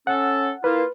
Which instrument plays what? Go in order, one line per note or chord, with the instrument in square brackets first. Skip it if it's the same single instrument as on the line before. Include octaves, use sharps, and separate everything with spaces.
[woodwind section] C#4 A4 [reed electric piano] F#5
[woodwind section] A#3 E4 F4 [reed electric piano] B4